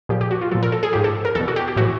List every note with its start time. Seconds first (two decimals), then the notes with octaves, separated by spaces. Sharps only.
0.09 A#2 F3 G4
0.21 G4
0.31 F#4
0.41 F4
0.51 A#2 F3 A4
0.63 A#4
0.72 A4
0.83 G#4
0.93 G#2 F3 G4
1.04 A4
1.25 A#4
1.35 E2 B2 A4
1.48 F#4
1.56 G4
1.68 G4
1.76 A2 E3 F#4